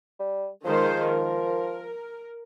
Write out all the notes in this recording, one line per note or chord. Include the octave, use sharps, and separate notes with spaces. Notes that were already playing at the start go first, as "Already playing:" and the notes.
G3
D#3 F3 G#3 C5
A#4